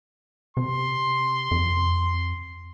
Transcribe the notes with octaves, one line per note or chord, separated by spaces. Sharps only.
C3 C6
F2